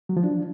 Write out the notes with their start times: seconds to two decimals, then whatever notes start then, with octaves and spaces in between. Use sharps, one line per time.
0.09 F#3
0.17 F3
0.24 D4